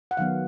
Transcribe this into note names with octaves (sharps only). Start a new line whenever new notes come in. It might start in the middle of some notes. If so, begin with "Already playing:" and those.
F#5
D#3 F#3 B3 F5